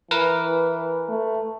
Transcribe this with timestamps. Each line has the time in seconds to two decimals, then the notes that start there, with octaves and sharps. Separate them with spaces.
0.11 E3 A#4 B4
1.08 A3